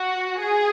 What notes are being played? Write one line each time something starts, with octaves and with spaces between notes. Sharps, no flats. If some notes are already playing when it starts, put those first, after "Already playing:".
Already playing: F#4
G#4